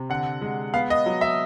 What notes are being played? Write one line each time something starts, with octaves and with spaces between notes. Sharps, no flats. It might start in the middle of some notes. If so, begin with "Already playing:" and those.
Already playing: C3
D3 F#5
G#3
B3 F5
D#5
F#3
E5